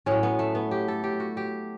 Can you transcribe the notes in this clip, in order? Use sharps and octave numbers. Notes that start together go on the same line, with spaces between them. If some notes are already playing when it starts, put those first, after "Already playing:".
A2 F#3 C#4
B3
A3
B3
G4
A4
G4
F#4
G4